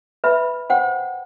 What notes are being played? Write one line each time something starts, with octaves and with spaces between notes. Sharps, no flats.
B4 E5 B5
C5 F#5 G5